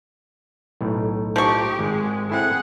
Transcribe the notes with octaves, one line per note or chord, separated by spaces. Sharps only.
B1 A2
F3 D#4 G4 C#6
G#1 G#3 G#4
C4 E4 G#4 A4 F#5